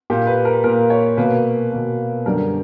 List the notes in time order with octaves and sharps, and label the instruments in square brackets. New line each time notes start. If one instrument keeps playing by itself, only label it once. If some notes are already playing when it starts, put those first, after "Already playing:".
[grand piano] A#2 A#3 G4
B4
A#4
A#2 A#3 A#4
C#5
B2 A#3 B4
B2 A#3
F#2 D3 G3 A#4